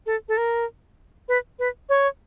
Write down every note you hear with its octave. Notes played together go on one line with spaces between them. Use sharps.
A4
A4
A#4
B4
B4
C#5